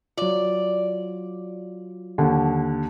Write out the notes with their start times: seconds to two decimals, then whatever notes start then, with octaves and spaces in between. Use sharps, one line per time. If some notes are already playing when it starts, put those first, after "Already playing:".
0.18 F#3 F4 D5
2.18 D#2 D3